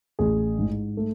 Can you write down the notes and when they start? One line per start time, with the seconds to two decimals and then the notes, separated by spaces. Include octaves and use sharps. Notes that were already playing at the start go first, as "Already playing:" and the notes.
0.19 A1 G#4
0.59 G#2
0.97 A3